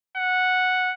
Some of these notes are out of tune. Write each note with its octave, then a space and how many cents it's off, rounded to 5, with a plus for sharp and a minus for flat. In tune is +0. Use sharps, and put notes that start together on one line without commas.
F#5 -5